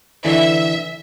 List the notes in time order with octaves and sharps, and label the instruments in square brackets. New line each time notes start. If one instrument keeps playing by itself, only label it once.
[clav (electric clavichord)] D3 E3 [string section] E5